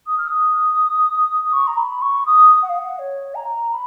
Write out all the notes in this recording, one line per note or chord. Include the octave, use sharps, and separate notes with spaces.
D#6
F6
D#6
D#6
C#6
A#5
B5
C#6
D#6
F#5
F5
F#5
C#5
A#5
B5